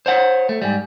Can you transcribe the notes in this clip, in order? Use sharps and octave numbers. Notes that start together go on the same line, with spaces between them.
C5 C#5 F#5
A3
G#2 G3